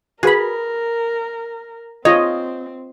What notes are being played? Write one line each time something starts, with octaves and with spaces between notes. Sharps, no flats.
F#4 G#4 A#4 B4 B5
C4 F4 C#5 D#5